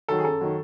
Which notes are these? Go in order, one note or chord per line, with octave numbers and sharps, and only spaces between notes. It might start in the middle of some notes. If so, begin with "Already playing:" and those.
D#3 F#3 A4
G#4
F#2 A4
D#3 F#3